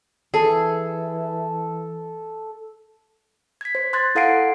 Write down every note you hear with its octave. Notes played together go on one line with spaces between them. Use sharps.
E3 G#4 A4
G#6 B6
C5
C6 F#6 G#6 A6
E4 A4 F5 F#5 C7 D7